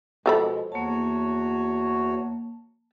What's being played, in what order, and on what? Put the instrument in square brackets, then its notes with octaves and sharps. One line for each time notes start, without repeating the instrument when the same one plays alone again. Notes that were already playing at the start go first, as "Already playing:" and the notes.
[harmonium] B2 G#3 [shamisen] F3 A4 B5
[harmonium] E2 F#4 C#5 [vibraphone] A#3 A5